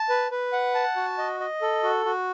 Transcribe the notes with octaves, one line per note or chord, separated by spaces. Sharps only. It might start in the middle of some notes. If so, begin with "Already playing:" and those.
Already playing: A5
B4
B4
F#5
A5
F#4
D#5
D#5
A4
F#4
F#4